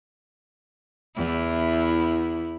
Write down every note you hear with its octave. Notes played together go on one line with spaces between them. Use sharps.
E2 E4